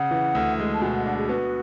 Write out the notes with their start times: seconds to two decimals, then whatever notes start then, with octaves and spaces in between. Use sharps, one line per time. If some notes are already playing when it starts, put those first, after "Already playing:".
Already playing: C#3 F#5
0.11 E3
0.35 D2
0.59 G#3
0.74 A5
0.81 B2 G#5
0.94 F#5
1.06 D4 F#5
1.18 G#4
1.29 B3 F#4